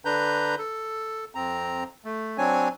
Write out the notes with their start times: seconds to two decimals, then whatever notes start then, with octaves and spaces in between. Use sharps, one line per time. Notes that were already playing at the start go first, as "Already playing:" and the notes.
0.05 D3 D4 B4 A#5 G6
0.59 A4
1.35 F2 C4 A#5
2.05 A3
2.38 F#3 C4 D4 C#5 G#5